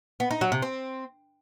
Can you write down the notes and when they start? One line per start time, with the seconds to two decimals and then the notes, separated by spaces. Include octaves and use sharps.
0.20 B3
0.31 D#4
0.41 F#3
0.52 C3
0.62 C4